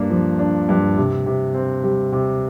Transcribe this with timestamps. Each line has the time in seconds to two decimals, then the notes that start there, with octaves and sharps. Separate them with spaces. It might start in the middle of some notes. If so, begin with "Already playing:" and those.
Already playing: G2 A#3 D4
0.10 F3
0.39 D4
0.69 G2
0.97 C3
1.26 C3
1.54 C4
1.84 G3
2.12 C3